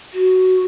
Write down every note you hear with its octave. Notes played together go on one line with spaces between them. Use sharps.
F#4